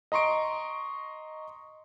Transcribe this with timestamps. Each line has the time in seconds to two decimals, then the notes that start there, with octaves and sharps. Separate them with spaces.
0.12 D#5 A#5 C6 C#6 D7